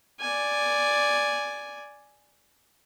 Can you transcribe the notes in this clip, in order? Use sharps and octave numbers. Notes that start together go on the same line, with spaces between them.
D5 G#5